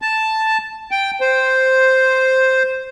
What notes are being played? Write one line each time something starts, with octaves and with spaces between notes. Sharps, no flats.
A5
G5
C5